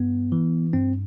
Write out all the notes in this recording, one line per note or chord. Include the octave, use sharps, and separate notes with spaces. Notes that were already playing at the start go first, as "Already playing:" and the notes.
Already playing: G2 B3
E3
G2 C4